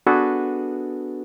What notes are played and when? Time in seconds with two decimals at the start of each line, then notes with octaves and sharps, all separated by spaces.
0.07 B3 D4 F#4 G#4 A4 B4